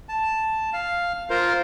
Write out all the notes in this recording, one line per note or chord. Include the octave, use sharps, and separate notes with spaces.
A5
F5
F4 A#4 C5